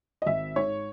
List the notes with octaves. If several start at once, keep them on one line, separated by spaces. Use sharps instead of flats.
D#5
G#1 E5
G#2 C#5